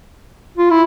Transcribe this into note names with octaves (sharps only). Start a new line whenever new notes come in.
F4
E4